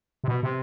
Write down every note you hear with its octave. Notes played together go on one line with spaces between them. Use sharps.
C3
B2
C3